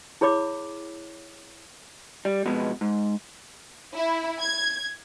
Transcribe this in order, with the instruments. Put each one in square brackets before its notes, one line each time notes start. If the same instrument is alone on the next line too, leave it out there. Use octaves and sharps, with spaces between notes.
[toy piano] E4 G#4 C#5 B5 D6
[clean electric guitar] G3
F2 B2 G#3 B3
G#2
[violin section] E4
G#6